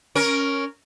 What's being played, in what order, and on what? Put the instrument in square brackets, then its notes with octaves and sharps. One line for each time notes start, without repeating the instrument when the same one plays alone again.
[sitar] C#4 A#4